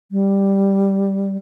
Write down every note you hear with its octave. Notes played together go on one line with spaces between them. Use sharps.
G3